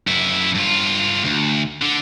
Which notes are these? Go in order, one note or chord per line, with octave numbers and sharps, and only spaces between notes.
F#2 E4
G2 F4
D2
D3